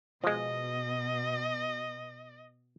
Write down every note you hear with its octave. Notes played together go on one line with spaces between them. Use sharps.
B2 F3 G#3 D#5